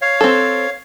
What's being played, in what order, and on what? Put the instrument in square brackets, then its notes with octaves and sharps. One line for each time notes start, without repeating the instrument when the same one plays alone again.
[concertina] C#5 F5
[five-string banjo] C4 A4